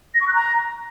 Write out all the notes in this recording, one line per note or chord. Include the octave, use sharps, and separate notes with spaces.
A#6
C#6
F#6
A#5